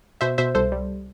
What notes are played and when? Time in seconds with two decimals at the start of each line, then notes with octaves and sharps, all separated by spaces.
0.21 B2 C5 E5
0.38 B2 C5 E5
0.55 C2 A4 C5
0.72 G3